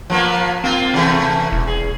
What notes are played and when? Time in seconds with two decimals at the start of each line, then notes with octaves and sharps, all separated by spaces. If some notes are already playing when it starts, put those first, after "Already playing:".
0.10 F3 A#3 B3
0.64 A#3 C4 F4
0.94 C3 E3 A3
1.52 E1
1.67 G#4